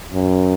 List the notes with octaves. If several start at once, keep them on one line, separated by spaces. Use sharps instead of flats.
F#2